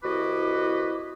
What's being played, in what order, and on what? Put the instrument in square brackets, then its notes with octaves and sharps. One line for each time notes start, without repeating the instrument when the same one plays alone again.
[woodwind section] C2 E4 F#4 B4 D#5 D6